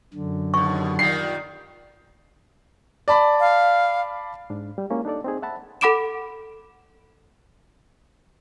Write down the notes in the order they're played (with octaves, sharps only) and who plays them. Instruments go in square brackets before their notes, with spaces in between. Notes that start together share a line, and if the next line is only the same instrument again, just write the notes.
[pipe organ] F#2 D3
[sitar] D#2 B2 [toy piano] C#6
[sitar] A#2 D#3 G3 [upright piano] C7
[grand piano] D5 A5 B5
[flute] F5
[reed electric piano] G#2 D4
G3
G#3 A#3 C#4 E4
D4 D#4 A4 D5
C4 D#4 G#4
E5 F#5 A5 B5
[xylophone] A4 F#5 B5 D6 D7 E7